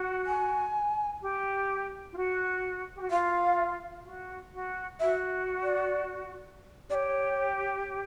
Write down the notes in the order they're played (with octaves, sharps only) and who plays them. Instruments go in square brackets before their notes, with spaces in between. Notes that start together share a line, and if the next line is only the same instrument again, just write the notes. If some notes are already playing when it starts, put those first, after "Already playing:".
Already playing: [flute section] F#4
[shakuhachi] G#5
[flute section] G4
F4
F#4
G4
F#4
[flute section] F4 [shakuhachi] F5
[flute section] F#4
F#4
[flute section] F#4 [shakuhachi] E5
[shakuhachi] D5
[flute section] G4 [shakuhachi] D5
[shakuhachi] C#5